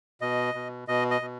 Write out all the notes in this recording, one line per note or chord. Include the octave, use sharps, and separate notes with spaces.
B2 D#5
B2
B2 D#5
D#5
B2